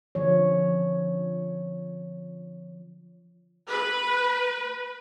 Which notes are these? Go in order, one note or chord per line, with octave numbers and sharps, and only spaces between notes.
D3 F3 C#5
B4